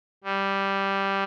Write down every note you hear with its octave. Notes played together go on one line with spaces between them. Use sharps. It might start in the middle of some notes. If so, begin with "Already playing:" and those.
G3